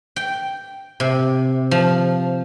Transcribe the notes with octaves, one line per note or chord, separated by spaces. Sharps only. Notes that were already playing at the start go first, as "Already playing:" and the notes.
G5
C3
F3